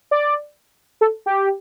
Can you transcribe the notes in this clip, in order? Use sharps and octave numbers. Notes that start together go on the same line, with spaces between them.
D5
A4
G4